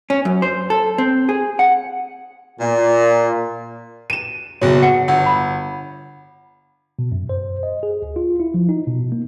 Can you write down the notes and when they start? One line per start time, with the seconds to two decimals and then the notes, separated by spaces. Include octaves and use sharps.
0.10 C#4
0.25 F#2
0.42 C5
0.70 A4
0.98 C4
1.29 G#4
1.59 F#5
2.60 A#2
4.10 D#7 E7
4.61 F#1 B2 C#5
4.82 F#5 C#7
5.08 G1 F#5 E6
5.26 B5
6.99 B2
7.12 F#2
7.29 C5
7.63 D#5
7.83 G#4
8.02 D2
8.16 F4
8.40 E4
8.54 F3
8.69 D#4
8.87 B2
9.12 A#3